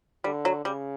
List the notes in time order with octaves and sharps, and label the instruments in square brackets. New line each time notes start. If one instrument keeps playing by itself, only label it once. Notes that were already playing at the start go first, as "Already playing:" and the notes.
[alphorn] D3 [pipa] G3
[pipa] F#3
[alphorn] C#3 [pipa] G3